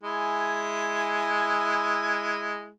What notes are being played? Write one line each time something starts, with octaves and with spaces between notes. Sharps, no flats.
G#3 E4 G#5